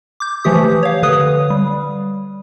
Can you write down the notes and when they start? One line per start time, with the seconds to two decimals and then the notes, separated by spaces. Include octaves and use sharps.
0.20 D6 G6
0.44 E3 F3 A3 G4 D#6
0.83 C#5 F5
1.03 D3 B4 D#6
1.50 G3